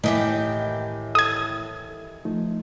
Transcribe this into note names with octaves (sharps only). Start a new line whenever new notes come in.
A2 D#3 E3 G4
A4 D#6 G#6
F3 A3 D#4